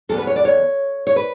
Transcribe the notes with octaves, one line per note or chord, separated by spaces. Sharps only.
E2 D3 G3 B3 A4
B4
C#5
D5
C#5
C#5
B4